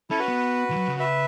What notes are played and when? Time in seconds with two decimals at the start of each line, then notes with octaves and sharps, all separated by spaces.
0.10 C#4 E4 A4
0.19 F#4 B4
0.28 B3
0.70 E3
0.76 F#3
0.88 C#3
1.00 B4 E5